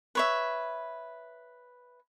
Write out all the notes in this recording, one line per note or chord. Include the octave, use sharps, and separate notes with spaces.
B4 C#5 E5